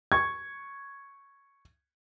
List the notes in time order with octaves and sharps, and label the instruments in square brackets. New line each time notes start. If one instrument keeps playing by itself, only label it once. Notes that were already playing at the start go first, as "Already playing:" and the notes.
[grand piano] C#6 G#6